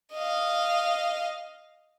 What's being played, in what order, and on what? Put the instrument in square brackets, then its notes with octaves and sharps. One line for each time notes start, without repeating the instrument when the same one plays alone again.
[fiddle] D#5 F5